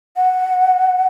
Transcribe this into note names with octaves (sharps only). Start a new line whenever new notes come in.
F#5